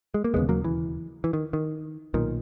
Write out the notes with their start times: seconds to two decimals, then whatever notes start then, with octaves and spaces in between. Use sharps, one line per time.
0.14 G#3
0.24 A#3
0.34 E1 D#2 C#3 G#3 B3
0.49 F#3 A#3
0.64 E3
1.24 E3
1.33 D#3
1.53 D#3
2.14 B1 A#2 D#3